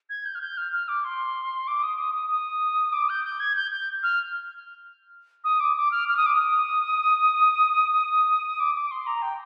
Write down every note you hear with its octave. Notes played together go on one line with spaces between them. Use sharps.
G#6
G6
F6
G6
F6
F6
D6
C6
D6
D#6
D#6
D#6
D#6
D6
G6
G6
G#6
G6
G6
F6
D#6
D6
D6
F6
F6
D#6
D6
D#6
D6
D6
C6
A#5
G5